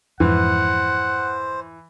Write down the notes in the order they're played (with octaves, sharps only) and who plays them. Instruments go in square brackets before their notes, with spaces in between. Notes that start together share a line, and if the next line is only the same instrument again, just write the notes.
[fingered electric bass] F2 G#2 [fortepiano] E3 [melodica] C5 [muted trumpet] F#5